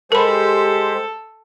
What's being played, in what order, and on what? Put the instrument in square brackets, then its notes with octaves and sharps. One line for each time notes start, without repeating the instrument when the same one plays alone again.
[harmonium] G#3 G4 C5 [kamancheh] A4 [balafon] A#4 B5